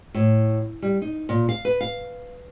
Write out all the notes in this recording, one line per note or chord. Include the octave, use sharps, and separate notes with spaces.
A2
G3
D#4
A#2
F5
B4
F5